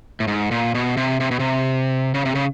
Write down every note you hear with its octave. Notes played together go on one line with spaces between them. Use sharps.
A2
G#2
A#2
B2
C3
C3
B2
C3
C#3
C3
C#3